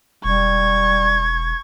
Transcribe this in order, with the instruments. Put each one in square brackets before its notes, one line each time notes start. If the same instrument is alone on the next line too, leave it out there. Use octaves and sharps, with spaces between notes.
[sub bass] E1 [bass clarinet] G3 [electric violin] C#6 [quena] G#6